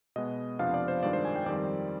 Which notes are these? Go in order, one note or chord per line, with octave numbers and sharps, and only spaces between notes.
B2 G#3 B3 D#5
F2 C3 F3 B3 D4 F5
D5
C5
G2 D#3 G#3 D4 F4 D5
C5
G#5
G5
F2 D#3 G3 C4 D5